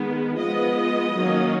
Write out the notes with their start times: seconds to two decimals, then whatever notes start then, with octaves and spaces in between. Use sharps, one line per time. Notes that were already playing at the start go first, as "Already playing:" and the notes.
Already playing: D#3 G#3 B3
0.39 F3 G#3 B3 D#5
1.18 D#3 F#3 A#3 C#4